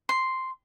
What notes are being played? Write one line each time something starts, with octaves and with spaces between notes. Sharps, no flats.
C6